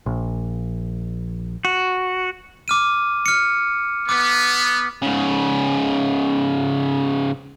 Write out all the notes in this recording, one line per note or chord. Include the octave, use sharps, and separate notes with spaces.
A#1
F#4
D6 F6 D#7
F6 C#7
B3 D6
G#2 C#3